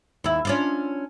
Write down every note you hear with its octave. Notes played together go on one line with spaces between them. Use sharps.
D#2 E4
C#4 D4 F4